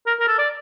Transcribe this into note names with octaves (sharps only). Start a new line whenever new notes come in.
A#4
A#4
A4
D5